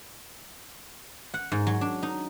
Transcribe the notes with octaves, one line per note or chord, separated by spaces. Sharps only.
F#5
G#2
F#3
D4
D#4